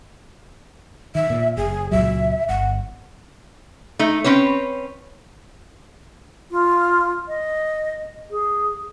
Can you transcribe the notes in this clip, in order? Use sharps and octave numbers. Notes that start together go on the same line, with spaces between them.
D#3 E5
A#2
F#1 G#4
C#2 A#2 F#3 E5
G1 F#5
A3 D#4
C4 C#4 B4 C#5
F4
D#5
G#4